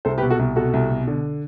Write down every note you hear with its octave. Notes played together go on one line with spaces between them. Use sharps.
C2 A4 C5
G4 B4
B2
F#4 A4
C2
B2 F#4 A4
C2
B2
D3